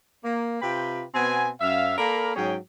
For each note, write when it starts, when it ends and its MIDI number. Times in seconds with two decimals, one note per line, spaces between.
0.25 0.59 58
0.62 1.04 48
0.62 1.04 65
0.62 1.04 71
0.62 1.04 79
1.15 1.50 47
1.15 1.50 59
1.15 1.50 60
1.15 1.50 80
1.61 1.97 42
1.61 1.97 76
1.61 1.97 77
1.98 2.35 58
1.98 2.35 69
1.98 2.35 70
1.98 2.35 74
1.98 2.35 77
1.98 2.35 83
2.36 2.56 44
2.36 2.56 54
2.36 2.56 61
2.36 2.56 68
2.36 2.56 79